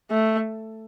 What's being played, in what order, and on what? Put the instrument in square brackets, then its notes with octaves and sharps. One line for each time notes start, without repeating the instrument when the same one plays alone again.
[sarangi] A3